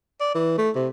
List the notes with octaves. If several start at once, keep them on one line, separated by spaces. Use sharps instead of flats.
D5
E3
A3
C3